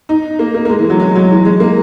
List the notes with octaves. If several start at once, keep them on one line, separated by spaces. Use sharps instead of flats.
D#4
A#3
A#3
A#3
G#3
E3
F#3
G#3
F#3
E3
G#3
A#3